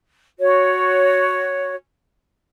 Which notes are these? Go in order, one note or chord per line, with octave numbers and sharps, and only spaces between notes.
F#4 C#5